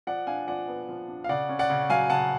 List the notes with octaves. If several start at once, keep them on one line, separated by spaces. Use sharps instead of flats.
F3 D5 F#5
D4 F5 G#5
F3 D5 F#5
B3
F3
D4
F5
C#3 D5 F#5
C#4
D5 F#5
C#3
F#3 F5 G#5
C#3 F#5 A5